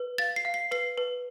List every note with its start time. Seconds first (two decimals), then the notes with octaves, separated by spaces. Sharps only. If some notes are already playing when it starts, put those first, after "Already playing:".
Already playing: B4
0.18 F5 A6
0.36 C7
0.45 F5
0.54 C7
0.71 B4 C7
0.98 B4